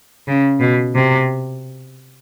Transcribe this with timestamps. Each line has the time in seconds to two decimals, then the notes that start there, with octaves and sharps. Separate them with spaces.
0.27 C#3
0.60 B2
0.95 C3